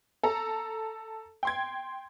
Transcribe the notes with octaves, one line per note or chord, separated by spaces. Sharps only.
A4 A#5
G5 C6 G#6